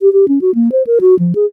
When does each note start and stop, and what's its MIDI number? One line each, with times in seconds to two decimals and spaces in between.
0.01 0.12 67
0.13 0.28 67
0.28 0.39 61
0.41 0.54 66
0.55 0.72 58
0.72 0.83 72
0.87 0.99 70
1.01 1.17 66
1.19 1.33 53
1.35 1.45 68